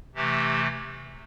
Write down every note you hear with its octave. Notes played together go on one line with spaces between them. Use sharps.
C3 E3 A3 G4